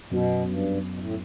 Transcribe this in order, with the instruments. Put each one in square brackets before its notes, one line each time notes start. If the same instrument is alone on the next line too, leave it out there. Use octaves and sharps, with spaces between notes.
[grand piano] F#2 F#3 B3 F#4 [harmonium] B2
[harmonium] G2
B2
A2